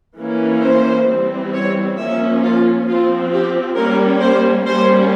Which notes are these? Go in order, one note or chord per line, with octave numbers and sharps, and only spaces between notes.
E3 A#3 C#4
C5
E3 G3 C4
C#5
F3 A#3 C#4 E5
F4
F3 C4 F4
G4
G3 A#3 C#4 A#4
C5
G3 A#3 C#4 C5